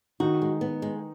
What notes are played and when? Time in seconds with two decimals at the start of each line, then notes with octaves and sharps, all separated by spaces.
0.20 D#3 D#4 F#4
0.42 G#3
0.61 B3
0.82 G#3